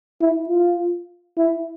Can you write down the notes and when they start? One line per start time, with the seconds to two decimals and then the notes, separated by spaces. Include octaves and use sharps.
0.21 E4
0.49 F4
1.38 E4